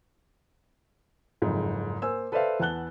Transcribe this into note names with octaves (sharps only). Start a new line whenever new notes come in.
F#1 F2 G#2
A#3 C5 G#5 E6
A4 B4 C5 D5 E5 F5
E2 B3 A5 F#6 G7